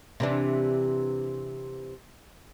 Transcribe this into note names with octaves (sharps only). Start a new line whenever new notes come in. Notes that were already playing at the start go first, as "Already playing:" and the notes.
C3 E3 D4